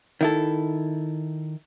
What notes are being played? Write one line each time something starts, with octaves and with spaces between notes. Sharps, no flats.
D#3 E4 A4